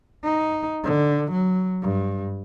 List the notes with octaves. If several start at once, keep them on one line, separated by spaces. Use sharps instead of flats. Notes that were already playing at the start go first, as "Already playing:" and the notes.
D#4
D3
F#3
G2